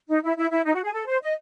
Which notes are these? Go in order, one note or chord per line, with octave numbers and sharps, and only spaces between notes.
D#4
E4
E4
E4
D#4
F#4
G#4
A4
C5
D#5